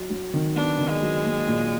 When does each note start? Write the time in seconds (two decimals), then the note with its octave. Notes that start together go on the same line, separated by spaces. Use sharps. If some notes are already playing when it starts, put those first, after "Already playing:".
Already playing: F#3
0.10 F#3
0.34 D#3
0.56 B3 D4
0.79 D#3
0.90 G#3
1.02 F#3
1.25 A#3
1.47 A#2